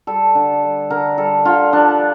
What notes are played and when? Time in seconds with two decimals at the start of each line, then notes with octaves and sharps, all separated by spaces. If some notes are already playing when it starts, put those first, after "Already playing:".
0.07 G3 A4
0.35 D3
0.63 G3
0.90 D3 A#4
1.18 G3 A4
1.45 D3 F4
1.73 F3 D4